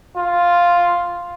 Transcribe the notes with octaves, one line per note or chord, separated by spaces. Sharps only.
F4